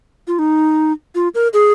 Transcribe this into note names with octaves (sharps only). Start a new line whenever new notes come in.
F4
D#4
F4
A#4
G#4